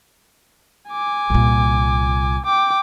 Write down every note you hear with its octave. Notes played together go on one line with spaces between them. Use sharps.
G#5 D6
C2 A#2
G5 D6